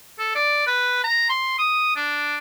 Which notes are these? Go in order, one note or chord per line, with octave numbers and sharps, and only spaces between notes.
A4
D5
B4
A#5
C6
D#6
D4